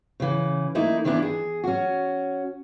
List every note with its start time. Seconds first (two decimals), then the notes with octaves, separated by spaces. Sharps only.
0.20 C#3 E3
0.75 A3 A#3 D#4 E4
1.04 D#3 E3 B3 D4 E4
1.22 G#4
1.64 C#4 F#4